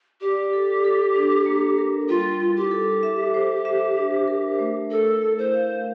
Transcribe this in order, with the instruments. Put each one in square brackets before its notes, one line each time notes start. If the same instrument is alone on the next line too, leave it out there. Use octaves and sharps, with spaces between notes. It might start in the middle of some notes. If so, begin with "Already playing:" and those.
[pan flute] G4 [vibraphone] D5
[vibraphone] A4
A4
D4
A#3
A#4
[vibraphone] G3 [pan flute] F4
[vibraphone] E4
[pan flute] G4
[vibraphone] A4
E5
C5
E5
D4
A#4
A3
[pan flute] A4 [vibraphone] A#4
[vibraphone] E4
[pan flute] C5
[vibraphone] F5